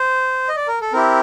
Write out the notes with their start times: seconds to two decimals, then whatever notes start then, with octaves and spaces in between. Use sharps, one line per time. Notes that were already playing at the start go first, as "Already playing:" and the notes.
Already playing: C5
0.49 D#5
0.56 D5
0.68 A#4
0.82 A4
0.93 C4 E4 G4 A#4